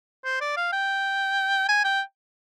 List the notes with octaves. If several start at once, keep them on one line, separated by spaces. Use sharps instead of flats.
C5
D5
F5
G5
G#5
G5